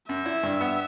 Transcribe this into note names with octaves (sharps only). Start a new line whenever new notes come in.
F#2 E5
E4
G2
B3